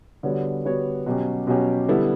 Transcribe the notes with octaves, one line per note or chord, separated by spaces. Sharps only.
D3 G3 B3 F#4 C#5
D3 G3 B3 F#4 C#5
B2 F#3 C#4 G4
B2 F#3 C#4 G4
D3 G3 B3 E4 A4